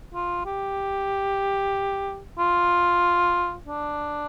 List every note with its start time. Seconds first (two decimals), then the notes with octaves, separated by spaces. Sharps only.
0.15 F4
0.46 G4
2.39 F4
3.67 D4